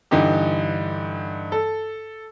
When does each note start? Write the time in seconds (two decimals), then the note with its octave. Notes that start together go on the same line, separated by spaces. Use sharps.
0.11 G2 D3 E3 D#4 G4
1.52 A4